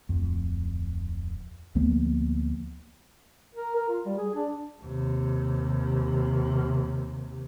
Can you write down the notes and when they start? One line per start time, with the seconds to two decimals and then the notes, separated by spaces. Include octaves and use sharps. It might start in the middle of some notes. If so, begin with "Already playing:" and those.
0.09 D1 F2
1.75 D2 F3 A#3 B3
3.55 A#4
3.75 A#4
3.89 F4
4.05 G3
4.17 G#4
4.35 D4
4.82 D#2 C3